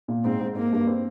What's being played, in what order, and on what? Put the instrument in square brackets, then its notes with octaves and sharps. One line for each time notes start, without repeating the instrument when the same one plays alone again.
[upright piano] A#2
[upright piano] G#2 [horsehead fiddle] C4
[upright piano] G#2
[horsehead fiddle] A#3 [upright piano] C4
[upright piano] G2
C4